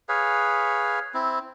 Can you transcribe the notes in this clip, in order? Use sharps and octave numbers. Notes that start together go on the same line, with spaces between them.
G#4 B4 C#5 F5
C4 E4